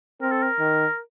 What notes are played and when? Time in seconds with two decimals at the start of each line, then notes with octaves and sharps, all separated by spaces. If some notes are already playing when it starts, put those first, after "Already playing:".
0.21 C4 A#4
0.32 A4
0.43 A#4
0.59 D#3